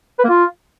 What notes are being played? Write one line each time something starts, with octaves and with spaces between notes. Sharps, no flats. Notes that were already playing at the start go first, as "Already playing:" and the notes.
B4
A#3
F4